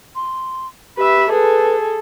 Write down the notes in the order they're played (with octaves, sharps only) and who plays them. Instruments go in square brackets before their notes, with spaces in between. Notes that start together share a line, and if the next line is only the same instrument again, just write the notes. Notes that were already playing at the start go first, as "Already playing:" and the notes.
[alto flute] C6
[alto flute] G4 [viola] B4 E5
[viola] G#4 A4 [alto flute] B4